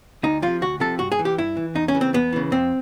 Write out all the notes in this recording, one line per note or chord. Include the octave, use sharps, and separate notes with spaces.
D2 D#4
C3 F3 F4
D2 F#4
C3 F3 A4
G2 F#4
G#4
E3
G4
G2 E4
E3
E2 D#4
C#4
C#3 E3
C4
E2 B3
C#3 E3
F2 C4